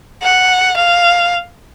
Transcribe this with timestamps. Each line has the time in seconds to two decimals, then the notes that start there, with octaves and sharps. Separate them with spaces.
0.23 F#5
0.77 F5